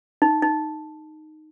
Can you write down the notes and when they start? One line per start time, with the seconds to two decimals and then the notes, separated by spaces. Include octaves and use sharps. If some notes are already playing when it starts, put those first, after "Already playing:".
0.22 D#4
0.42 D#4